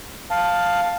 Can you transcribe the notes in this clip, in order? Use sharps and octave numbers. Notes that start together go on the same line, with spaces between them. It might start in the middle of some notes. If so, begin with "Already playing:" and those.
F5 A5